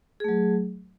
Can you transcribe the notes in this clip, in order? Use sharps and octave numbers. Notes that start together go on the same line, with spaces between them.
F#3 A3 G#4